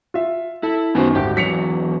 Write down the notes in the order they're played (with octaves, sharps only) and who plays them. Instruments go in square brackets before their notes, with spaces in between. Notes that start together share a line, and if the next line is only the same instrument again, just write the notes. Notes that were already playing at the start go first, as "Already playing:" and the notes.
[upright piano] F4 E5
[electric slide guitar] E4 [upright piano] A4
[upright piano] F#2 D#3 [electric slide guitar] B3 F#4 C5
[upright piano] G#1 D2 [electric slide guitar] G4
[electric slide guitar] E2 F#3 [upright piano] B6 C#7 F7